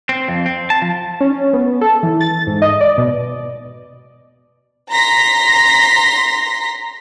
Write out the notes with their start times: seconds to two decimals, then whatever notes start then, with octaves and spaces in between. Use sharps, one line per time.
0.09 C4
0.28 F2
0.46 C4
0.70 A5
0.82 F3
1.20 C#4
1.53 B3
1.81 A4
2.03 E3
2.20 A6
2.47 G#2
2.62 D#5
2.81 D5
2.98 B2
4.90 A#5 C6 A#6 B6